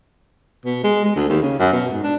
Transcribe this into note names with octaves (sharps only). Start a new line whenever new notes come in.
B2
G#3
G#3
D2
D#2
C#3
F#2
B2
G#2
D4